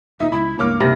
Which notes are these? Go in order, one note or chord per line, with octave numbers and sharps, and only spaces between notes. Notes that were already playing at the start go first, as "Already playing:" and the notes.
D#1 A#2 D#4 E5 D#6
C#2 E4 B5
C#2 G2 A#3 C#5 D6 F6
G#1 C3 B5 A#6